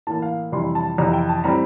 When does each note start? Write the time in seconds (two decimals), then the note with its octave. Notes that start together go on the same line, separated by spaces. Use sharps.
0.07 A2 E3 A#3 A5
0.22 F5
0.52 F2 C3 E3 G3 C6
0.75 A5
0.98 F2 C3 E3 A#5
1.13 G5
1.29 A5
1.44 A2 G3 C4 A#5